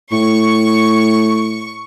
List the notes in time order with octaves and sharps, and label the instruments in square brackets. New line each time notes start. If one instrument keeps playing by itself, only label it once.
[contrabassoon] A2 [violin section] C#6